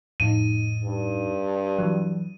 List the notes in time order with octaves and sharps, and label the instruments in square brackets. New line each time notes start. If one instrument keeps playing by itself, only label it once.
[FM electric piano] F2 A2 D#4 [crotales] D#7
[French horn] G2
[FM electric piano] E3 F#3